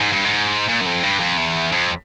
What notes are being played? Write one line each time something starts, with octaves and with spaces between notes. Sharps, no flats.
G#2
G2
G#2
A#2
F#2
F2
G2
F2
E2
F2